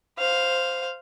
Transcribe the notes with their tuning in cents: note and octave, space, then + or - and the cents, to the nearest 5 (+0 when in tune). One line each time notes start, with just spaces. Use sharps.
C5 +0 F5 +0